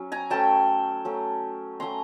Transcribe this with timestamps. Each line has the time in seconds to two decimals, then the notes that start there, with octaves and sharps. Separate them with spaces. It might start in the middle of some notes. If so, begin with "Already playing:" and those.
Already playing: F#3 C#4
0.12 G#5 A#5
0.30 F#3 A3 C#4 G5 A5
1.05 F#3 A3 C#4
1.80 F#3 A3 C#4 A#5 C6